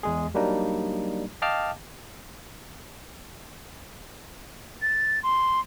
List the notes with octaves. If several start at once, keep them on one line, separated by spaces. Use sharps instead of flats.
E2 G#3 G#4
F#3 G3 A#3 D4 D#4
D#5 F5 G5 A5 D6 F6
A6
C6